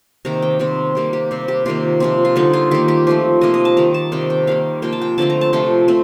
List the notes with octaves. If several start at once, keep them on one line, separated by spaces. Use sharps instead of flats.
C3 D#3 A#3 A#5
G5
C3 G3 C4
C3 G3 A#3
G4
C3 G3 C4
G4
C3 D#3 A#3 F4
C3 F3 C4
F4
D3 G3 C4 D#4
F4
D#3 A#3 G4
G4
F3 A3 C4
C3 F3 A#3 D#5
D#5
A5
D#3 G3 A#3 A#5
A5
C3 D#3 G3 C4 G5
G5
D#3 G3 A#3 F5
C3 F3 A#3 G5
A5
G5
D3 F3 A3 C4 A5
A#5
A5
C3 F3 A3 G5
A3 C4